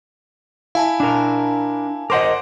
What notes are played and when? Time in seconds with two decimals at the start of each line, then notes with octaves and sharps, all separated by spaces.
0.75 E4 F5 G#5 A5
1.00 D4 A#4
2.10 A#4 C5 D#5 F#5 C6 D6